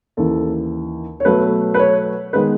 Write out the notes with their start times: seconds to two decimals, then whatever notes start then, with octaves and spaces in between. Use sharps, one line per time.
0.17 D#2 C#3 E3 A4
1.20 C#5
1.25 B2 F#3 A3 B4
1.74 B4
1.79 C#5
2.33 D#3 G#3 B3 B4